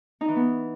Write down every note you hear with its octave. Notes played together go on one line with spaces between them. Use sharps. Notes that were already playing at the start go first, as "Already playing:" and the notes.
D#4
E3
B3